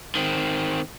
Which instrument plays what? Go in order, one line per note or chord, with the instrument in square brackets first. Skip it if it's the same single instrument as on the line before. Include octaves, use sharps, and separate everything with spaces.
[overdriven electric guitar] D#3 C4